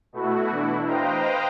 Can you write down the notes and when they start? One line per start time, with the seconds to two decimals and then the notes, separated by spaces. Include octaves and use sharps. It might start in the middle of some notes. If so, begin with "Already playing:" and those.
0.13 B2 A3 E4 F#4
0.51 E3 D4 E4
0.86 B4 C5 D#5 F5 G5 A#5